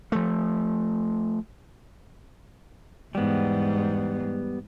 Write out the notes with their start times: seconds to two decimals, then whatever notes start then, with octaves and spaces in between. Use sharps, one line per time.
0.12 F3 A3
3.15 E2 G#2 G3 B3